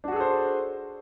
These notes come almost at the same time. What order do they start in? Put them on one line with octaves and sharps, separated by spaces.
D4 F#4 G#4 A4 C5